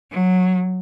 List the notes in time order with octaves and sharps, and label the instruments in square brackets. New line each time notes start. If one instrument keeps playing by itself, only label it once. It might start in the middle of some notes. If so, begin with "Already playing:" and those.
[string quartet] F#3